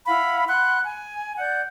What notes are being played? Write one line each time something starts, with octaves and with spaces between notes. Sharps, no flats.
E4 F5 F#5 B5
F#5 B5 C6 F#6
G#5
D5 F#5 G6